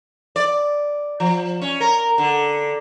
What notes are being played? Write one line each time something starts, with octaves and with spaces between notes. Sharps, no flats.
D5
F3
C#4
A#4
D3